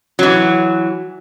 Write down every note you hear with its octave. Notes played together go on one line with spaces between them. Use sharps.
E3 F#3